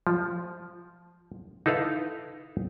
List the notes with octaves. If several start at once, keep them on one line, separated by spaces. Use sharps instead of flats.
F3
D#4 E4 A4 B4 F5